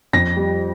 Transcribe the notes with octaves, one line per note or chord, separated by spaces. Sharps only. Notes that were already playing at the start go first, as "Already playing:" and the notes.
F2 A#6
G3